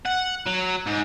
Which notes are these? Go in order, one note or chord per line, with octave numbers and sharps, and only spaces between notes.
F#5
F#3
G#2